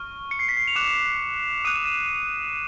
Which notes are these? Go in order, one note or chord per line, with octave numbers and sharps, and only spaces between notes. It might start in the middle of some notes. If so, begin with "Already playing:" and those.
Already playing: C#6 F6
C#7
C7
B6
C7
F7
D6 F#6 E7
D#6 F#6 D#7
E7
D#7